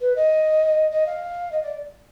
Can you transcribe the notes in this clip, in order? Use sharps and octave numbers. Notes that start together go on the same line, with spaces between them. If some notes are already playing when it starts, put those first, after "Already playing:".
B4
D#5
D#5
F5
D#5
D5